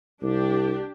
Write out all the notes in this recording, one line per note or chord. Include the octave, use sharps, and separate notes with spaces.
C2 D4 G4